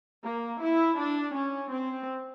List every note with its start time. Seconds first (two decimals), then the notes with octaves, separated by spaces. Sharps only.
0.24 A#3
0.61 E4
0.98 D4
1.35 C#4
1.73 C4